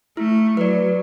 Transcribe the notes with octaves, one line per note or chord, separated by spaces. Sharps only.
A3 E4
F#3 B4 D5